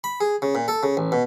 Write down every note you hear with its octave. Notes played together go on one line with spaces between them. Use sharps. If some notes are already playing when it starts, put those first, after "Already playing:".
B5
G#4
C#3
A#2
A4
C#3
A1
B2